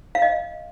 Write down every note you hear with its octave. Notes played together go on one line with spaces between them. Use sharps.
F5
D#5